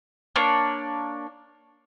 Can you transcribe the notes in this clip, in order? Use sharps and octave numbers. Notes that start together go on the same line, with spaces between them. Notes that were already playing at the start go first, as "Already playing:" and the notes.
A#3 D4 C#5